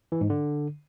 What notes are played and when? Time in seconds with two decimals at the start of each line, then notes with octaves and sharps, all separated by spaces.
0.12 E3
0.21 G#2
0.30 D3